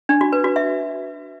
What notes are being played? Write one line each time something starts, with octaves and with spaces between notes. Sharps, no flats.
D4
F#4
B4
F#4
E5